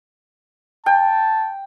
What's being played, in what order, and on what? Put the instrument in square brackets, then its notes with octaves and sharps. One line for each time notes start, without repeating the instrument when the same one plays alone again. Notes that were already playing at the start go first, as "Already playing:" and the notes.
[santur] G5 [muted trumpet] A5